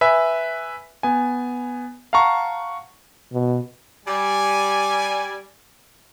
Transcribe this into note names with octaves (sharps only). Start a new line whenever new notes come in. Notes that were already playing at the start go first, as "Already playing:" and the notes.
B4 E5 G#5 B5
B3 G#5
F5 F#5 A5 A#5 C#6
B2
G3 D5 G#5